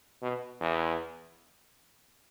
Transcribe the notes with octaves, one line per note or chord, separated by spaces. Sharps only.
B2
E2